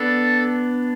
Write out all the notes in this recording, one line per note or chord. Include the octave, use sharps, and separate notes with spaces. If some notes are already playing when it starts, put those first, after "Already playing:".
Already playing: B3 D4 A4